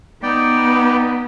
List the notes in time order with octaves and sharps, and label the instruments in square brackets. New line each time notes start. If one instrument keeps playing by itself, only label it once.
[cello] B3 [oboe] D#4 [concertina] D5 G5